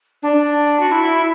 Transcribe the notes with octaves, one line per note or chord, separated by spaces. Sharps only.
D4
F#4
E4